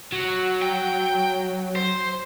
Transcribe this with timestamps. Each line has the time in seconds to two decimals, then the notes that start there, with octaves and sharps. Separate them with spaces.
0.13 F#3
0.62 G5
1.76 C5